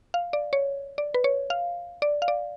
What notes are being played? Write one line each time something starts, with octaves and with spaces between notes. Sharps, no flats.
F5
D5
C#5
D5
B4
C#5
F5
D5
F5
D5